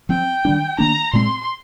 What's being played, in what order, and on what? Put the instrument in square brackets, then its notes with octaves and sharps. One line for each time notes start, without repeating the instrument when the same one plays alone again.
[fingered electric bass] F3 C4 [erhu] G5
[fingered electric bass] D#3 G3 D4
[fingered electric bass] D#3 A#3 D4 [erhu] A#5
[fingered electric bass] A#2 G#3 C4 [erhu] C6